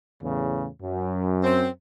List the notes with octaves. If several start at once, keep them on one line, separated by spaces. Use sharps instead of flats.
E2 A2 C#3
F#2
C4